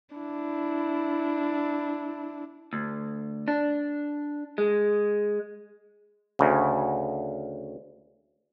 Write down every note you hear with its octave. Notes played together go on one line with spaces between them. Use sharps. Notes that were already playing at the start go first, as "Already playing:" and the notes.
D4 E4
D2
D4
G#3
D2 C#3